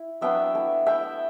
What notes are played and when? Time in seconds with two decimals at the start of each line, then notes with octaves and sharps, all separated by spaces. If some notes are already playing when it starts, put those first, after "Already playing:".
Already playing: E4
0.21 F#3 B3 D4 E5 G5
0.54 A3 E4
0.86 A3 E4 E5 G5